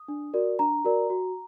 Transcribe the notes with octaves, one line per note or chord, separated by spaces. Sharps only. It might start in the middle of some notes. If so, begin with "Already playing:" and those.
Already playing: D#6
D4
F#4 A#4 D5
D4 A#5
F#4 A#4 D5
F#4